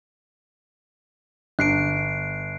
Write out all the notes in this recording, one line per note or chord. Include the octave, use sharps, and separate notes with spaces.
G1 F#6 C7 D7